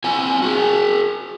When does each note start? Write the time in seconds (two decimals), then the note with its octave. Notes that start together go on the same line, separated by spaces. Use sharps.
0.04 C4 E4 G#5
0.42 F#4 G#4